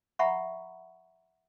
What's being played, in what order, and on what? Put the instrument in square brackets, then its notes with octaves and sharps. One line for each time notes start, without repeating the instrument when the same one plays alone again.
[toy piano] E5 F#5 A#5 B5 C#6